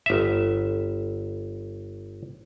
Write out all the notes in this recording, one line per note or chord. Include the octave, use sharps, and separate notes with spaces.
G1 E5